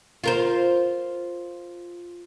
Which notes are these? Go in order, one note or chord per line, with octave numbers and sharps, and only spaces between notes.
F4 A#4 C5